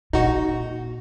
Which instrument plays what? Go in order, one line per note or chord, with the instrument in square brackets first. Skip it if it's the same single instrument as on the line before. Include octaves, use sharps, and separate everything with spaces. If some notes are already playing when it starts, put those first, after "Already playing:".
[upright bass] A#2 [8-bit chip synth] D#4 F#4